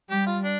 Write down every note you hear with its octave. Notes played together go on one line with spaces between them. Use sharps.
G3 G4
F4
D4